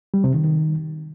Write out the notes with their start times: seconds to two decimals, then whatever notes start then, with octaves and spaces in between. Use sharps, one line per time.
0.14 G3
0.24 C3
0.34 D#3
0.44 D#3